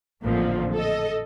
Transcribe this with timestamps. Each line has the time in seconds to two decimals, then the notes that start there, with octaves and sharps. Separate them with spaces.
0.23 A1 F2 A#2 D3 F3
0.74 A4 D#5